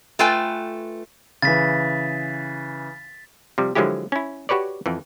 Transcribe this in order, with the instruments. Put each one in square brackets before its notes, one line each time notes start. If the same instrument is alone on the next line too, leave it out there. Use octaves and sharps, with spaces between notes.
[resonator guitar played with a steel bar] A3 F4 B4 G5 G#5
[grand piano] C#3 E3 [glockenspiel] A6 B6
[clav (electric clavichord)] C3 F3 G3
D3 F3 F#3 G#3 E4 G4
C#4 E4
F#4 G4 B4 C#5 D5
F2 E3